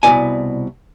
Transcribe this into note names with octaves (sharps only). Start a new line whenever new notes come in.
C2 B2 F3 E4 D5 G#5